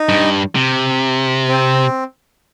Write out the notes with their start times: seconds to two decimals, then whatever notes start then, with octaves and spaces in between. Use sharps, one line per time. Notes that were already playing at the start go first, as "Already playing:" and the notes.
Already playing: D#4
0.09 G2
0.55 C3
1.48 C4